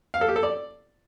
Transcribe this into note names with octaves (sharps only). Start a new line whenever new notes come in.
F5
A4
G4
A4
D5